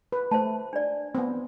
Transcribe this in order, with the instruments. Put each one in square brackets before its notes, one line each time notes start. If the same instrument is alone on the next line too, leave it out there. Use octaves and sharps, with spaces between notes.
[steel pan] B4
[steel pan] A3 [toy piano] C5 A5
[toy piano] D4 D5
[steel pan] B3 C4